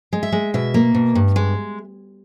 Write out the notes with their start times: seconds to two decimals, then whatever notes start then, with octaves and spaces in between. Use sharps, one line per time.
0.13 G#3
0.23 E5
0.32 G#3
0.54 B2 E5
0.74 A#3
0.95 B2
1.15 G2
1.36 G#3